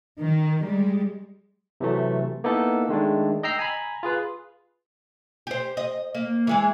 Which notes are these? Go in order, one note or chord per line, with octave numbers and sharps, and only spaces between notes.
D#3
G3 G#3
C3 E3 F#3 A3
A#3 B3 D#4 E4 A4
D#3 G#3 A3 D4
D#5 G5 A#5 E6 C7
G#5 A#5 B5
F4 G#4 B4
G4 C5
D#5
A#3
E3 G#3 G#4